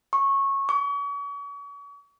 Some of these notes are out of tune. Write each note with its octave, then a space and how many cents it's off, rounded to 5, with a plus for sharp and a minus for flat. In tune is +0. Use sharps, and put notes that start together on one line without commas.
C#6 -15
C#6 +40